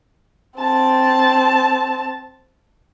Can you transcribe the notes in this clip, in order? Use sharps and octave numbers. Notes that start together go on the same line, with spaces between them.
C4 A5